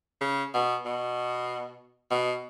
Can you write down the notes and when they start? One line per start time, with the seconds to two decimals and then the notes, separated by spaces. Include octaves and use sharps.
0.21 C#3
0.54 B2
0.85 B2
2.11 B2